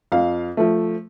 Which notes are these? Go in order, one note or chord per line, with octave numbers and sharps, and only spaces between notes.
F2 F5
F3 A3